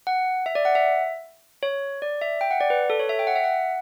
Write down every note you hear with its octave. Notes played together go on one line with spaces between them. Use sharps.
F#5
E5
D5
F#5
E5
C#5
D5
E5
G5
F#5
D5
B4
A4
C#5
E5
G5
F#5
E5
F#5